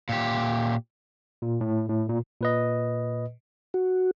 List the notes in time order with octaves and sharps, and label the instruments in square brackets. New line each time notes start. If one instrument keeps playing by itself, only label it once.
[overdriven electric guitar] A#2 G4
[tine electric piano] A#2
A2
A2
A#2
A#2 B4 D#5
[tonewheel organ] F#4